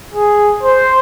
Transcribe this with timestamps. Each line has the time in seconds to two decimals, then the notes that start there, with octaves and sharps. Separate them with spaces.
0.14 G#4
0.63 C5